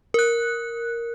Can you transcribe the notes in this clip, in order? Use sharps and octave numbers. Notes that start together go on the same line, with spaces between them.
A#4 F#6